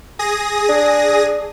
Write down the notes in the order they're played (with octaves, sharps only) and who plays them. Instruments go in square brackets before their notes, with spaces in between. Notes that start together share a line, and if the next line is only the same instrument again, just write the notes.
[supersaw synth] G#4 D#6 A#6
[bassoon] D4